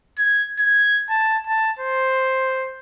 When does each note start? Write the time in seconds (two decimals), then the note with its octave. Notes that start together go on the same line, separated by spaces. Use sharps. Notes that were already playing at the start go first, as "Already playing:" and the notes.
0.19 G#6
0.59 G#6
1.10 A5
1.47 A5
1.79 C5